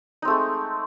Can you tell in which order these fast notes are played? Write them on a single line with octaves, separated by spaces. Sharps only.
D#4 C4 A3 G#3